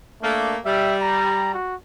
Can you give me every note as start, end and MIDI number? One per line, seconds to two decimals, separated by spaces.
0.22 0.58 57
0.22 0.58 58
0.22 0.55 62
0.65 1.51 55
0.65 0.95 76
1.01 1.52 82
1.54 1.75 66